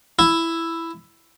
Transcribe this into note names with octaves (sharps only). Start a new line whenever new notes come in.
E4